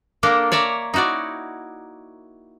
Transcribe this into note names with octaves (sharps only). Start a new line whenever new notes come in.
A#3 D4 A4 A#4
C#5 D5 E5 A#5
D#4 E4 F#4 C#5 D5